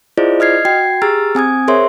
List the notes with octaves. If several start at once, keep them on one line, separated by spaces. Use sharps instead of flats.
E4 F4 G#4 C5 D5 D#5
D#5 F6 G#6 C7
F#4 G5 G#6 C7
G4 G#4 A#5 E6 F6 A6
C4 G#5 D#6 G#6
G#4 A#4 C5 C#5 E5 C6